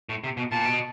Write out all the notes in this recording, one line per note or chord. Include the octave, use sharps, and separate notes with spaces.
A2
C3
B2
A#2 A5
B2